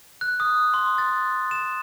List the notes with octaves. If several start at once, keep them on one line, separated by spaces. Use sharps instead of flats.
F#6
D#6
C6
A6
E7